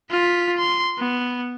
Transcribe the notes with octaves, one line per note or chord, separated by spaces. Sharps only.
F4 B6
C6
B3